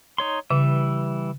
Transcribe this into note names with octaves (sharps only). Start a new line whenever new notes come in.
D#4 C#5 C6
C#3 E3 G3 E5